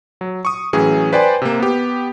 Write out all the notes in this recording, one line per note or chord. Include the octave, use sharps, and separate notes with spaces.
F#3
C#6 D#6
A2 E3 F#3 C#4 G#4
B4 C5 D5 G5 G#5 C6
C3 A#3
B3 G4